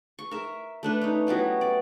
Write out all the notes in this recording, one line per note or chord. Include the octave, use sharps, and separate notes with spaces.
C#6
A#4 E5
A3 D4 B4
C#4 D#4
F#3 G3 B3 E4
D5